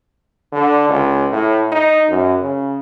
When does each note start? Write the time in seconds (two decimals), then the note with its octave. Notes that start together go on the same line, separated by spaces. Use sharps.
0.52 D3
0.89 C#2
1.32 A2
1.72 D#4
2.09 F#2
2.40 C#3